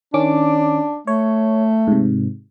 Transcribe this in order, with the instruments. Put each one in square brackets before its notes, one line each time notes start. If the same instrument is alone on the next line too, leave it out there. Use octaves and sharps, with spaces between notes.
[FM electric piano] D#3 C#4 D6 [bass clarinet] D4
[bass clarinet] A3 [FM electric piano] C#5
[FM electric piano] G#2 C3